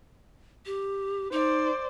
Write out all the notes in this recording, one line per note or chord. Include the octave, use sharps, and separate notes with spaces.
G4
D#4 C5 D5